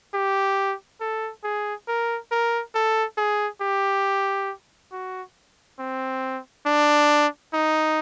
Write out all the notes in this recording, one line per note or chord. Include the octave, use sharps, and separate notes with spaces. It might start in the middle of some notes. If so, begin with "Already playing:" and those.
G4
A4
G#4
A#4
A#4
A4
G#4
G4
F#4
C4
D4
D#4